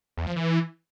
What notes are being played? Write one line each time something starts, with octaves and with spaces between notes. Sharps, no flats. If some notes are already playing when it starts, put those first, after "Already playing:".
E2
F3
E3